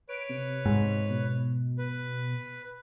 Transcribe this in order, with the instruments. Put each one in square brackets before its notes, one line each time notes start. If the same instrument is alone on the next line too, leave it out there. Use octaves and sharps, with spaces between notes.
[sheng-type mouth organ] B4 C#5 [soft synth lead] D7
[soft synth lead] C3
[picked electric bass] G#2
[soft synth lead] B2
[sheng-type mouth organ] B4